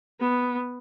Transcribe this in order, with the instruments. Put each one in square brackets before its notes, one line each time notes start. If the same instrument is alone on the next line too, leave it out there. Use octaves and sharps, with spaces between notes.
[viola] B3